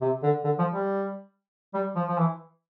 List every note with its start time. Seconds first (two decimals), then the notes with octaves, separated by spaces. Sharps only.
0.01 C3
0.23 D3
0.44 D3
0.59 F3
0.73 G3
1.74 G3
1.96 F3
2.08 F3
2.18 E3